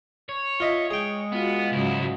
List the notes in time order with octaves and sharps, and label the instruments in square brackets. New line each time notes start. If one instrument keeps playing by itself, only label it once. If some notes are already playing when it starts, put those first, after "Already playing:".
[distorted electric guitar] C#5
[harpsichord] F4 D#5 E5
[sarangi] G#3 [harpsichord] G#4 G5
[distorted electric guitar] B3 [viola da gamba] F4 F#4
[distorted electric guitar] C#2 E4 [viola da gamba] G#2 C#3 F#3